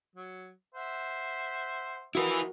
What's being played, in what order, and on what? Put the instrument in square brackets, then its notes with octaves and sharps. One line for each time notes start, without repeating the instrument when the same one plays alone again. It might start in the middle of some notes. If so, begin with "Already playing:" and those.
[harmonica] F#3
C5 E5 F#5
[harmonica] F3 D#5 [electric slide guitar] E4 B4 [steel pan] F#4 A#4